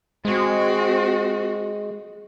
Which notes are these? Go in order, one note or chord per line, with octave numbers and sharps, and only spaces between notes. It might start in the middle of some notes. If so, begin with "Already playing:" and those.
G#3 C4 F#4